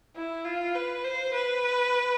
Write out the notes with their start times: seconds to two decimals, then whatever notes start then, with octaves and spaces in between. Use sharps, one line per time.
0.16 E4
0.45 F4
0.75 B4
1.05 C5
1.34 B4